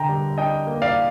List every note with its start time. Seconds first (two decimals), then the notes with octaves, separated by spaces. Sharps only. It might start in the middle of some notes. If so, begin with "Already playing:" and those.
Already playing: D3 G5 A#5
0.09 G3
0.38 D4 D#5 G5
0.67 A#3
0.82 D5 F5